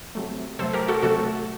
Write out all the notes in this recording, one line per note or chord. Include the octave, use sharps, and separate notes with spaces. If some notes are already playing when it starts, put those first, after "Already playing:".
C3 F#3 A3
C3 F#3 A3 A4 C5
G4 A#4
F#4 A4
C3 F#3 A3 F#4 A4